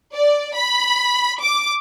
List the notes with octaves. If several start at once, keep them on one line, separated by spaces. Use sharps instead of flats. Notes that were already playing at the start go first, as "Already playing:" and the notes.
D5
B5
D6